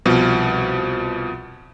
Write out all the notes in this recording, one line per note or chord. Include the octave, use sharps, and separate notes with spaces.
C2 B2 F3